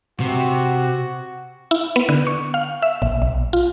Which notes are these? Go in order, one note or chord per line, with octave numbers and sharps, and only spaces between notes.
C3 F#4
E4
B3
D3
C#6
F5
E5
A#1
B1
F4